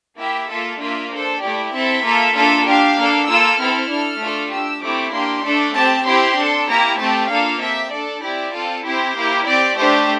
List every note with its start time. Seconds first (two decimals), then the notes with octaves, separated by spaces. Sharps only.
0.18 A#3 E4 G4 E5
0.49 A#3 F4 A4 E5
0.80 A#3 D4 F4 E5
1.11 D4 A4 C5
1.42 A3 E4 G4 D5
1.73 C4 E4 A4 E5
2.04 A#3 F4 A4
2.34 A#3 D4 F4 A4
2.66 D4 G4 F5
2.96 A#3 D4 A4
3.27 A#3 F4 A4 E6
3.59 C4 E4 A4 F6
3.90 D4 A4
4.20 A3 D4 F4 A4
4.51 D4 G4 E6
4.82 A3 C4 E4 G4 D6
5.13 A#3 D4 G4 C6
5.45 A3 D4 A4
5.75 C4 G4 A5
6.06 C4 E4 G4 C6
6.37 D4
6.42 A4
6.68 A#3 E4 G4 A#5
6.99 A3 C4 G4 A5
7.30 A#3 D4 F4 A4 F5
7.61 C4 G4 E5
7.91 D4 A4 D5
8.23 C4 E4 G4
8.54 C4 F4 A4
8.84 C4 E4 G4 C5
9.16 A#3 E4 G4
9.46 C4 G4 D5
9.78 A3 D4 G4 C5